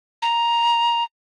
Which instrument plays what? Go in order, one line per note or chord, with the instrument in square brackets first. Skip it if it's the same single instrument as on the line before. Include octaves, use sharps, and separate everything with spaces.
[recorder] A#5